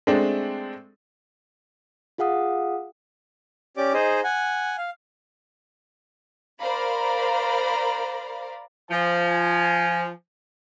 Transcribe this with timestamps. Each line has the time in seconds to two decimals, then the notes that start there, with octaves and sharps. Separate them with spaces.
0.07 G#3 A3 C4 D4
2.18 F4 G#4 F5 F#5 D#6
3.77 C#4 G4 D5 D6
3.93 D#4 G#4 C5 D#5
4.24 F#5 G#5
4.78 F5
6.60 A#4 C5 D5 F5 A#5 B5
8.90 F3 G#5